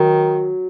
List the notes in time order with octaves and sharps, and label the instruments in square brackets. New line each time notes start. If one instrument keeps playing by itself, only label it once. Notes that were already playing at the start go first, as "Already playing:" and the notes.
Already playing: [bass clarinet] D#3 [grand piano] F#3